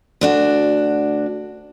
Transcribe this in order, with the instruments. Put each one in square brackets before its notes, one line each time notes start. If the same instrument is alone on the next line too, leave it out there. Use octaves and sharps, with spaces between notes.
[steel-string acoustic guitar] D2 D4 F#4